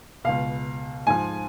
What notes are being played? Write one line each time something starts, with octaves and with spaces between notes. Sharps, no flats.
C#2 B2 F5
G#2 F3 G#5